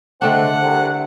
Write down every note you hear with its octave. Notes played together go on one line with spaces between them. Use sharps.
D3 G#3 A3 C4 D4 F#5
C2 C3